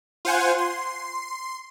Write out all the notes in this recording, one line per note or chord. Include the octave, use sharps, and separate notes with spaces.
F4 C5 F#5 G#5
C6